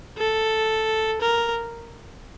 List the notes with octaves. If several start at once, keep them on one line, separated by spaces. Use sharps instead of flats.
A4
A#4